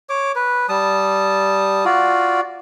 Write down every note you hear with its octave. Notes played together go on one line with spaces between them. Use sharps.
C#5 D6
B4
G3 A5 D#6
F4 F#4 D5